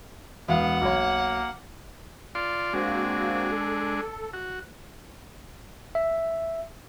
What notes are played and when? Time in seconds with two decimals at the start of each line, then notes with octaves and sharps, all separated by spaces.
0.48 E1 B3 F5 F#5
0.81 B1 A#3 C#5
2.35 F4 D5 C6
2.73 G#3 A#3 C4 D4 F#4
3.52 A4
4.34 F#4
5.95 E5